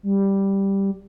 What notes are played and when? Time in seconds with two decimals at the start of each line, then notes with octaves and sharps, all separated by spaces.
0.03 G3